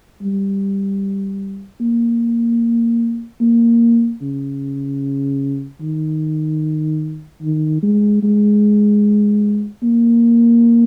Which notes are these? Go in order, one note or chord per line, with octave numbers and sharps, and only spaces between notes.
G3
A#3
A#3
C#3
D#3
D#3
G#3
G#3
A#3